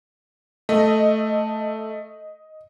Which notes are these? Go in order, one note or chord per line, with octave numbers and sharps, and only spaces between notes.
A3 D#5